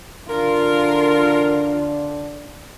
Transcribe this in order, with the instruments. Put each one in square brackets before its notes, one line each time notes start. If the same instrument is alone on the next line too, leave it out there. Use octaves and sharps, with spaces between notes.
[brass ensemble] D3 D4 [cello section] F4 [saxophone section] A#4